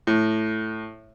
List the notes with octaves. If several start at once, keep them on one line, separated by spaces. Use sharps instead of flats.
A2